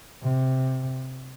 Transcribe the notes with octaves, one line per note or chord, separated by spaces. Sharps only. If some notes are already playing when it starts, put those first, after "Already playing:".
C3